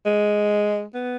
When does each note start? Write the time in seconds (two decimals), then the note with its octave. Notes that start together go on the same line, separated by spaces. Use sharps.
0.06 G#3
0.94 B3